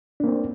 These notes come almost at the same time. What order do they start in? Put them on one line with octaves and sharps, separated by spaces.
D4 A#3 C4